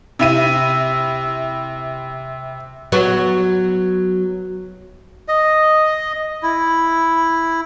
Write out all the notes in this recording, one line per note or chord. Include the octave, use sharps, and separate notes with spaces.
C3 E4 D#7
F#3 B3 F#4
D#5
E4